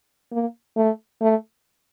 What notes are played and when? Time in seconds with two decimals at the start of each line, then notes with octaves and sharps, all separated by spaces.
0.32 A#3
0.76 A3
1.21 A3